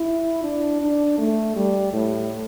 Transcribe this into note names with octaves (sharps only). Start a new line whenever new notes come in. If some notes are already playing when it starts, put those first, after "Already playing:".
Already playing: E4
D4
D4
A3
G3
A2